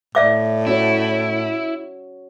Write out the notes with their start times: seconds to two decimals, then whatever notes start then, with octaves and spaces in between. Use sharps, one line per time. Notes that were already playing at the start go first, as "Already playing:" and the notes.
0.15 A2 D5 E5 D6
0.67 C#4 E4 F#4 C#5